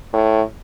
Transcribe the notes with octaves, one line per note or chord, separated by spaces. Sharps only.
A2